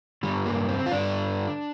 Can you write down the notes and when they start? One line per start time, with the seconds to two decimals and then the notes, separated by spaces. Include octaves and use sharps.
0.23 G2 D3 G3
0.46 A#3
0.68 C4
0.86 F4
0.92 G2 D3 D4